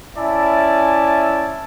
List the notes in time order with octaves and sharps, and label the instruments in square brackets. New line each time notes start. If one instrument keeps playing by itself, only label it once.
[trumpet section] C#4 E4 D5 E5 G#5 A5